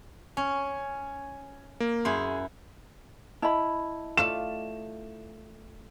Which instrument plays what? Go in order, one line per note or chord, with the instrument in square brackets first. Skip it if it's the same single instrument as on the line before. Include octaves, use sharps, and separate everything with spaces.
[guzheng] C#4 [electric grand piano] G#5
[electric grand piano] A#3
[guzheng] F#2 E4 [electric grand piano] G#4 C6
[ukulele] E4 B5 [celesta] D#5 A5
[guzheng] A3 F4 D5 [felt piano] E7